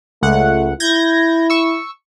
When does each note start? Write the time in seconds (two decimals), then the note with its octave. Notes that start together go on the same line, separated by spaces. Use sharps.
0.23 C#2 A3 F#5
0.80 E4 G6 G#6 A#6
1.50 C#6 E6